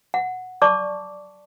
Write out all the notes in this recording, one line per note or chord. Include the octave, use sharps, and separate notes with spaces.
F#5
D5 A5 C#6 D6